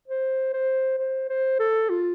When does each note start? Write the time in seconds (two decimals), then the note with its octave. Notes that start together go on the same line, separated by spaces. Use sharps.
0.08 C5
0.53 C5
0.98 C5
1.29 C5
1.59 A4
1.90 F4